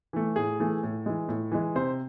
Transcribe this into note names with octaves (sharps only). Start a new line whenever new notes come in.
E3 A3
A2 G#4
E3 A3
A2
E3 G#3
A2
E3 G#3
C3 C5